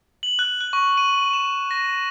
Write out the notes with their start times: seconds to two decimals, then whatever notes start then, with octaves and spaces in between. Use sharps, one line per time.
0.23 F#7
0.39 F#6
0.61 F#6
0.73 C#6
0.97 D#7
1.33 E7
1.71 A#6